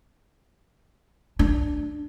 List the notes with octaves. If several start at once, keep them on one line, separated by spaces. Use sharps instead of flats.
D4